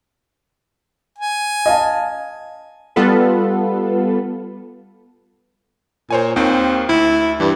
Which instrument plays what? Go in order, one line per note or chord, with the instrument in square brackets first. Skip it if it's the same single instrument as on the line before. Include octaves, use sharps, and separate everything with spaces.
[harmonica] G#5
[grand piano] D#5 F5 A5
[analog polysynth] G3 B3 F4 A4 B4
[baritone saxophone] A#2 [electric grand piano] C5 C#5 G#5
[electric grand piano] D#2 D#3 [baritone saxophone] C4
[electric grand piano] D2 [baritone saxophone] E4
[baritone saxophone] G2 [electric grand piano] E3